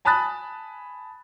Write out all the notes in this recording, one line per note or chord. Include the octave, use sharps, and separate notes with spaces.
G#5 A5 B5 D#6 F#6 A6